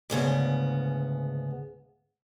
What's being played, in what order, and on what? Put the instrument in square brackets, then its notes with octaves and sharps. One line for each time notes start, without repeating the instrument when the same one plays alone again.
[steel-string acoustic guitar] D2 G#2 C#3 B3